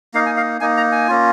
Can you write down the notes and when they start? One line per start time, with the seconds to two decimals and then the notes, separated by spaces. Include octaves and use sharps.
0.14 A#3 D#4 F5
0.26 G#5
0.37 F5
0.61 A#3 D#4 G#5
0.77 A#5
0.92 G#5
1.08 A#3 C#4 F4